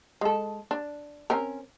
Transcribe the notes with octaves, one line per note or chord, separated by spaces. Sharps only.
G#3 A4
D4
C4 C#4 A#4